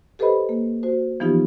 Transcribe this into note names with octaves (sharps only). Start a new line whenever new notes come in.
G4 A4 B4 C5 D#5 B5
A#3
F#4 C5
E3 F3 B3 D#4 F4 G4